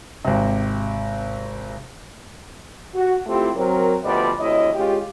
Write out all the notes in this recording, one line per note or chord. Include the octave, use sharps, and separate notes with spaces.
G#1 C3
F#4
A3 C4 E4 F4 G4
F#3 C4 A#4
D2 F3 G3 B3 D5 D#5
D2 C3 E4 C#5 D#5
G#3 C#4 F4 G4